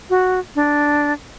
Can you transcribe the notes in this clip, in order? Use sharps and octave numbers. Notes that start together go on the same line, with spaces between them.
F#4
D4